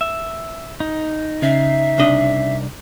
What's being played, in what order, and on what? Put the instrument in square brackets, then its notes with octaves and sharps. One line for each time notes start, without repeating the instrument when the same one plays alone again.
[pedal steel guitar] E5
D#4
[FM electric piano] C#3 C#4 C7 [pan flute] E5
[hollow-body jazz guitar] C2 D4 D#5